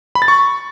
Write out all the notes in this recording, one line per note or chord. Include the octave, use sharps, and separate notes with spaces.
B5
A6
C#6